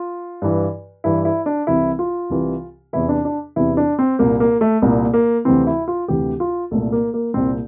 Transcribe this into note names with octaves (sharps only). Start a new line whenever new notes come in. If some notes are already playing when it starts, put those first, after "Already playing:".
Already playing: F4
G2 E3
G2 E3 E4
E4
D4
C2 C3 E3 E4
F4
C2 C3 E3
E2 C3 E3 E4
D4
D4
E2 C3 E3 E4
D4
C4
C2 A#2 A#3
A#3
A3
C2 A#2 A#3
A#3
D2 C3 E3 C4
E4
F4
D2 C3 E3 G4
F4
C2 A#2 A3
A#3
A#3
C2 A#2 C4